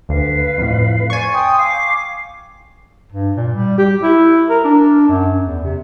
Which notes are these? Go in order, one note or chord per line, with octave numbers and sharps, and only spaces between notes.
D2 B4 F5
F2 A2
C5 D5 G#5 C#6
G5 C6 D#6
F5 D6
G2
A#2
G3
G4
E4
A#4
D4
F#2
E2
C3